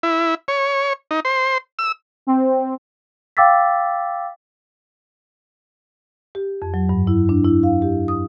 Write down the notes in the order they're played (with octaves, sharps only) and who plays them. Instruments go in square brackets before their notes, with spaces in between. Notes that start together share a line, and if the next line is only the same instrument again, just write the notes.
[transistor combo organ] E4
C#5
D#4
C5
E6
[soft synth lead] C4
[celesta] F5 G5 D6 E6 A6 B6
[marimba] G4
F2
F#3
G2
E4
D4
E4
F5
G4
D#6